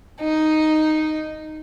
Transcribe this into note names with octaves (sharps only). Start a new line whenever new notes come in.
D#4